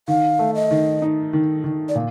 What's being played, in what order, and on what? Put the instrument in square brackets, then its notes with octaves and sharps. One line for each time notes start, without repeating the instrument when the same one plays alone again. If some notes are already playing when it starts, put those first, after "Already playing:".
[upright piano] D#3 [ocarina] F5
[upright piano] A3
[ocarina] D#5
[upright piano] D#3
D#4
D#3
D#3
[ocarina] D5
[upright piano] A#2